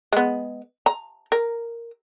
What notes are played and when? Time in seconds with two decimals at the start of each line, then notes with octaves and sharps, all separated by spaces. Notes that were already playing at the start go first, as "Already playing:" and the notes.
0.13 G#3 B3
0.86 A#5
1.32 A#4